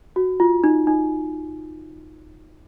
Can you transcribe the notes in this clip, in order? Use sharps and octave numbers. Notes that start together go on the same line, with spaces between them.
F#4
F4
D#4
D#4